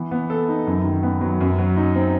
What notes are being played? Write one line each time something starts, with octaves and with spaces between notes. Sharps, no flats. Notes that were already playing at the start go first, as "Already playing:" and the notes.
Already playing: E3 B3
B3
A4
D#4
F#2
D#3
B3
F#3
F#2
F#3
D#4
C4